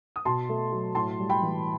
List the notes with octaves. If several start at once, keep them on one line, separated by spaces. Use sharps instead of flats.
D#6
B2 A5 C6
A3
F#3
A2 A5 C6
G3
G5 B5
E3